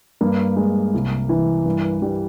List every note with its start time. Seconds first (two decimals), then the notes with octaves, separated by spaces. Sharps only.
0.21 G2 A#3
0.57 G#3
0.94 C2
1.29 E3
1.65 G2
2.02 G3